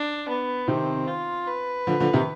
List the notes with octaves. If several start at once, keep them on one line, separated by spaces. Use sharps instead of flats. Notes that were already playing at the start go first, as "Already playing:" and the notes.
Already playing: D4
B3
C3 D#3 C4
F4
B4
D3 F3
D3 F3
C3 D#3